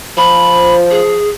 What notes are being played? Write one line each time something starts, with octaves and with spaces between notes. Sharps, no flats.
F3 B5
G#4